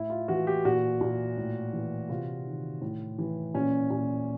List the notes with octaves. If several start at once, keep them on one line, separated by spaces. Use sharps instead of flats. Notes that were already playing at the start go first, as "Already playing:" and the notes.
Already playing: A2 E4
F4
E3 F#4
G4
A#2 F#4
A#2
A2
E3
C3 F4
D#3
A2
E3
A#2 C#4
A#2 C#4